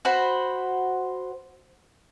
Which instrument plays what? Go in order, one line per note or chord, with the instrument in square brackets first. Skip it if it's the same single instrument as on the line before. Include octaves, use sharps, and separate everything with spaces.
[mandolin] F#4 C5 B5